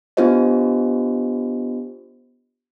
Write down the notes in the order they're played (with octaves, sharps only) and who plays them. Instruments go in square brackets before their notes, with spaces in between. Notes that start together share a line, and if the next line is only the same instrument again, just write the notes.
[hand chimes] B3 D4 F4 G4 C5 D#5